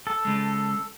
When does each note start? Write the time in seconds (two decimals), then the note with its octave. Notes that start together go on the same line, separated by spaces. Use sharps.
0.07 A4
0.25 C#3 G#3